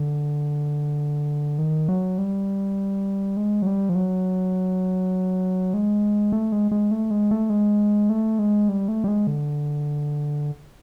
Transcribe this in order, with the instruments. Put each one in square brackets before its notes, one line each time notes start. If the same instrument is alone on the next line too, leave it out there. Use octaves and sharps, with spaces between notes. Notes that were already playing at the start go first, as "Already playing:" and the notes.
Already playing: [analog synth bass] D3
D#3
F#3
G3
G#3
F#3
G3
F3
F#3
G#3
A3
G#3
G#3
A3
G#3
A3
G#3
A3
G#3
G3
A3
G3
G#3
D3